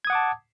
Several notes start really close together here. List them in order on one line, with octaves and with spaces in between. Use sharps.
G#6 D#6 F#5 D6 A5